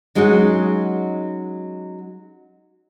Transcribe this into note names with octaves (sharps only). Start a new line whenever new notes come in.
F#3 G#3 C#4 D#4 F#4